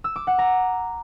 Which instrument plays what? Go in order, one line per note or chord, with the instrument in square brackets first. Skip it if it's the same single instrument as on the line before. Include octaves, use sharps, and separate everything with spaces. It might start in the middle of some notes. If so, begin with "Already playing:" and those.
[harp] E6
D6
F#5
A#5